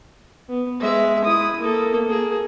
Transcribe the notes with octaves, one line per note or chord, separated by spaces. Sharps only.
B3
G#3 E5
E4 D#6
A#3 A4
A#3 G#4